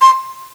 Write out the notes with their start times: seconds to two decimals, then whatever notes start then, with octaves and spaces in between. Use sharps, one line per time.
0.02 C6